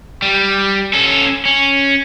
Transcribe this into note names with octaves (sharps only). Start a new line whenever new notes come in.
G3
C#4 A4
C#4